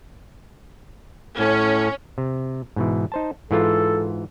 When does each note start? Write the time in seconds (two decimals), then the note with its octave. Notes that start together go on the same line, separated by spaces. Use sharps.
1.39 A2 C#4
2.18 C3
2.76 G#2 B2 E3
3.12 D#4 C5 A5
3.51 G#2 E3 F4 A4